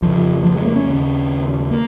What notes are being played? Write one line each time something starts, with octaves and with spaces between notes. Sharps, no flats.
F2 C#3 F3
F3
G#3
A#3
C#4
D#2 C#3
A#3